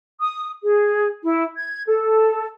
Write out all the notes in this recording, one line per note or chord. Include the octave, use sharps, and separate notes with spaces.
D#6
G#4
E4
G#6
A4